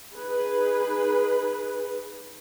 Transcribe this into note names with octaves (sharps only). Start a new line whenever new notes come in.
D#4 G#4 B4